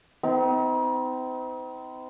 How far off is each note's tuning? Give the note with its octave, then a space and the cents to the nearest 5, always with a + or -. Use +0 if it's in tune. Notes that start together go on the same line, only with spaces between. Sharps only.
C4 -35 D#4 +40